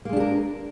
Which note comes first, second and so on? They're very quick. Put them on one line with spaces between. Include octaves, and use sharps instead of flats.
A#3 G#3 D4 G4 A#4